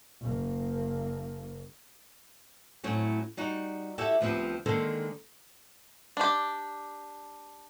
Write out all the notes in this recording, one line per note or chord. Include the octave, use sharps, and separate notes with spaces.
F#1 A#3
A2 F#3 C4 C#4
G3 D#4 F#4
E4 F#4 G4 A4 E5
D2 F3 B3 C4 G4
D3 D#3 G#3 A#3 A4 C5
D4 G4